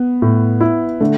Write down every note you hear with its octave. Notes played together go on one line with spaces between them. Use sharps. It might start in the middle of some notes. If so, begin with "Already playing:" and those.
Already playing: B3
A2
E4
D3 A3